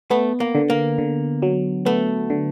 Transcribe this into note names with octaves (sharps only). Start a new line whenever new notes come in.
A3 B3
A#3
D3
A#3
D3
F#3
A3 B3
D3